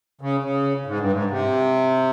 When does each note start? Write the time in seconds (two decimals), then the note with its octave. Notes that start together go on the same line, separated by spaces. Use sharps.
0.21 C#3
0.42 C#3
0.86 G#2
0.99 G2
1.11 G#2
1.30 C3